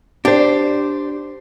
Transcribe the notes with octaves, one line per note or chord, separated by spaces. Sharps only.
D4 G4 C5